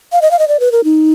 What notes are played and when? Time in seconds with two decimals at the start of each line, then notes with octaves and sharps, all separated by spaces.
0.12 F5
0.22 D#5
0.31 F5
0.39 D#5
0.48 D5
0.60 B4
0.72 A#4
0.84 D#4